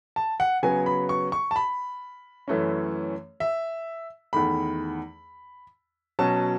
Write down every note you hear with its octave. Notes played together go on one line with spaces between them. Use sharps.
A5
F#5
C#3 F#3 B3 G#5
B5
C#6
C#6
A5
B5
F#2 E3 A3 C#4
E5
E2 D#3 A3 B5
B2 F#3 C#4 A5